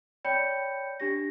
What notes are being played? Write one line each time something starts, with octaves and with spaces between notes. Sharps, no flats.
C#5 D5 G5 B5 G6 C#7
D4 G4 A#6